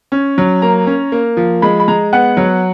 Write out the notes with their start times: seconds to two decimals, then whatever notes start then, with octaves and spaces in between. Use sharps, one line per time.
0.12 C#4
0.38 F#3
0.62 A#3 A#5
0.87 C#4
1.12 A#3
1.37 F3
1.62 G#3 B5
1.80 B5
1.88 G#3 A#5
2.13 B3 F#5
2.37 F#3